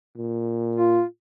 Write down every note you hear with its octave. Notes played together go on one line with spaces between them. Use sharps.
A#2
F4